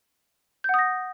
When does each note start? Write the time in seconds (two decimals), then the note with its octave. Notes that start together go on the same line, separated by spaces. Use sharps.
0.64 G6
0.69 F#5
0.74 D#6
0.79 A#6